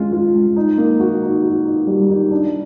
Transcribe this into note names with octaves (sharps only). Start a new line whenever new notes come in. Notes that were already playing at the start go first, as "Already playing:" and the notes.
Already playing: G#3 C#4 F4
F4
G#3
D#4
A#3
F#4
D#4
F#4
D#4
G3
D#4
D4